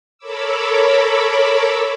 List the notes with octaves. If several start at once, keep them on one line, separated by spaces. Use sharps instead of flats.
A4 A#4 C#5 B5 D6 E6